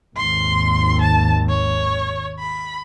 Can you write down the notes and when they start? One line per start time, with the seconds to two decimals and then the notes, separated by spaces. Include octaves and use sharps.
0.16 G#1 D#2 C6
1.01 A5
1.49 C#5
2.39 B5